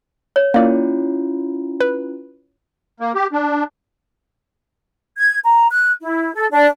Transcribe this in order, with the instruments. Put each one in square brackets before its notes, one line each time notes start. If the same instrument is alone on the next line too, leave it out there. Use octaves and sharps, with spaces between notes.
[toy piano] C#5
[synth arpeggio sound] A#3 D5 [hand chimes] C#4 E4 F4
[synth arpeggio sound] B4
[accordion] A#3
G4
D4
[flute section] G#6
A#5
F#6
E4
A4
D4